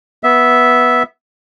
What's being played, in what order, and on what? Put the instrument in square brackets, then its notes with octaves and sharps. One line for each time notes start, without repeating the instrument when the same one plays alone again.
[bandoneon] B3 E5